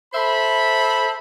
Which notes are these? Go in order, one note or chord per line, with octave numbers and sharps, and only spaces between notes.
A4 C5 E5 B5